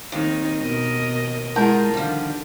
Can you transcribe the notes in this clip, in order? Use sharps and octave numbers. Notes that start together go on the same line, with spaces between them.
D#2 D#3 C4 D#4
B2 A#4 D#5
G#3 E4 F4 A#4 F#5 A5 G6
D3 D#3 F3 G3